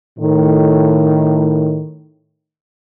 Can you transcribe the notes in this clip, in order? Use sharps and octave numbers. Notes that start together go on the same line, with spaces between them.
A2 D#3